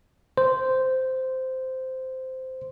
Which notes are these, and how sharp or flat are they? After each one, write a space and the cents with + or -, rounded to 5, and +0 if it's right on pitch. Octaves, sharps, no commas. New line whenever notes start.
C5 -10